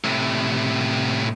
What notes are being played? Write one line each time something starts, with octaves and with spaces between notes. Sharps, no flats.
A2 C3